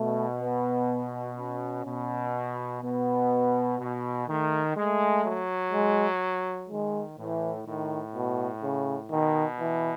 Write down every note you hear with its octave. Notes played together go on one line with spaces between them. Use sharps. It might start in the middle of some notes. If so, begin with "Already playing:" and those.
Already playing: B2 A3
B3
C#4
B2
B2 B3
B2
D#3 A3
G#3 A3
F#3
G#3
D#3 G#3
A2 E3
A2 D#3
B2
C#3
B2 D#3
E3